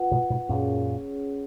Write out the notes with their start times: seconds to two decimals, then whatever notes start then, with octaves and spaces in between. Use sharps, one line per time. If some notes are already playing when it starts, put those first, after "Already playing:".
Already playing: F4 B4 F#5
0.11 G#2 B2
0.30 G#2 B2
0.49 F#2 A#2 C#4 G#4 C#5